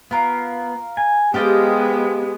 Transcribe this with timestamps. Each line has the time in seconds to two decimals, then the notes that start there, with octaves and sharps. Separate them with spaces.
0.11 B3 F4 A#4
0.97 G#5
1.34 G#3 B3 C4 G4 D#5 F5 G5 A5